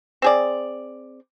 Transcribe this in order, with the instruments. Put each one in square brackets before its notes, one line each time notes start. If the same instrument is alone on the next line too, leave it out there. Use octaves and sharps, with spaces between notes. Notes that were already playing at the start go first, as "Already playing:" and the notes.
[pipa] C4 G#4 D5